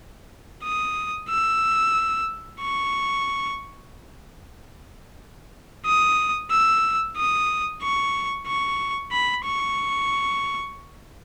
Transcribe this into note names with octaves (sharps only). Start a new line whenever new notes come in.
D#6
E6
C#6
D#6
E6
D#6
C#6
C#6
B5
C#6